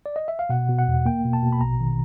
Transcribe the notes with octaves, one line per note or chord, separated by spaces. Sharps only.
D5
D#5
E5
F5
B2 F#5
B2
F#5
E2
A#3 G5
B2
A5
B2
B5
A#1 A#5
D#3